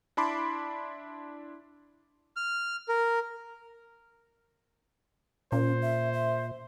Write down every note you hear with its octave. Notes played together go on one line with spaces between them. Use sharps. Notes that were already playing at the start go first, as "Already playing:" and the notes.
D4 E4 A5 B5 C6 D6
F6
A#4
A#2 C#4 C5
E5
E5